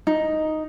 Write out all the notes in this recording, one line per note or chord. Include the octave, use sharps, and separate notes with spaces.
D#4